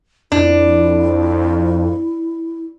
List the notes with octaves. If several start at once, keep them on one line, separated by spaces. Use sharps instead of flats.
F2 D4 E4